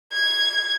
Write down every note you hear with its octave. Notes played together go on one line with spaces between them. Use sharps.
G#6